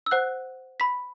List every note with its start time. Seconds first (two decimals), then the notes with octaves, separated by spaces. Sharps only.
0.06 E6
0.11 C5 F#5 F#6
0.80 B5 B6